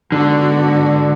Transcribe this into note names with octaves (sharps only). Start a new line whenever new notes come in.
G#2 D3 G#3 B3 F#4